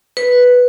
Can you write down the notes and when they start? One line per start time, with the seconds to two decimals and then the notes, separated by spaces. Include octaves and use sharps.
0.17 B4